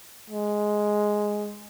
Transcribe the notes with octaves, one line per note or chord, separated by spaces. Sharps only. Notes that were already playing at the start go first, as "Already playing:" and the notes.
G#3